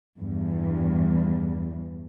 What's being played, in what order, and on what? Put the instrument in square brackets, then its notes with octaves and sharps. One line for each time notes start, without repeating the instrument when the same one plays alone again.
[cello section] E2 G2 E3